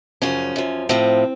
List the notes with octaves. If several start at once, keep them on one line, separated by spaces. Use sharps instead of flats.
F#2 C#3 F3 C#4
F#2 F3
A2 F3 C4